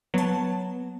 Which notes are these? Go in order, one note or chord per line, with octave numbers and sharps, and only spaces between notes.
F#3 B3 A5